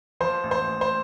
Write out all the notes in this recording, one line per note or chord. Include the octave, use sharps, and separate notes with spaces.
F3 C5
A1
C5
A1
C5